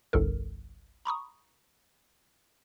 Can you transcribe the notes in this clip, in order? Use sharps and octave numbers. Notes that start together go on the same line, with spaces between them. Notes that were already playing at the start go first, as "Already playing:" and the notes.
G1 C2 G2 A4 A#4
A#5 B5 C#6 D#6